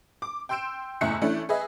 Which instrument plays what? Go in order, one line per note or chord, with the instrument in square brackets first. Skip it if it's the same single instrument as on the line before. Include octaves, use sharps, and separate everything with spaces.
[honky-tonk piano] D6
G5 C6 E6 G6 D7 E7
F#1 E2 A2 E5 F#6 C#7
E3 A3 C#4 D4 E4
G#4 B4 D#5 E5